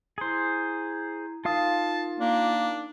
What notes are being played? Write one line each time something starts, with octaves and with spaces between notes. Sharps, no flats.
E4 G#4 C5 A#5
D#4 F4 A#4 F5 A5 D#6
A#3 D4